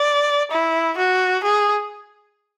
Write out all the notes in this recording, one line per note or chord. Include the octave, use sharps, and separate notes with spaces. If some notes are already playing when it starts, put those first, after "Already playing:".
Already playing: D5
E4
F#4
G#4